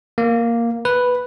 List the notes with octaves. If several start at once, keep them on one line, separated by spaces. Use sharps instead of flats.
A#3
B4